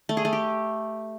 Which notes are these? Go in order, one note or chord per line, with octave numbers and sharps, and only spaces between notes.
A3
G#4
A3
G4